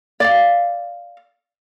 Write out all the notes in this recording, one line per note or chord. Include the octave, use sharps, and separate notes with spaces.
D5 F5